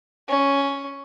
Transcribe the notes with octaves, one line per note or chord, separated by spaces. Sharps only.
C#4